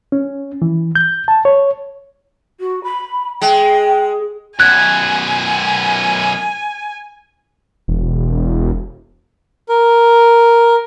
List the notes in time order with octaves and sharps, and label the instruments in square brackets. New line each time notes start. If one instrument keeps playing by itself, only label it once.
[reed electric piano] C#4
E3
G6
A5
C#5
[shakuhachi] F#4
B5
[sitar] G#3 [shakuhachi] G5
[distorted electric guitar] F#2 B2 [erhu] G#5 [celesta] F#6 G#6
[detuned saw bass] E1
[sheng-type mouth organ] A#4